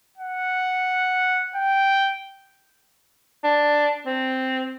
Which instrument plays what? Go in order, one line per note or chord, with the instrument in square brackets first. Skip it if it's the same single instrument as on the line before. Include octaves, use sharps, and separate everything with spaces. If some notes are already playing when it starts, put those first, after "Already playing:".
[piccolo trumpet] F#5
G5
[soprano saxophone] D4
C4